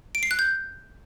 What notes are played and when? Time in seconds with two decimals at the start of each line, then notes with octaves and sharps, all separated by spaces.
0.15 D7
0.23 C7
0.31 F#6
0.39 G6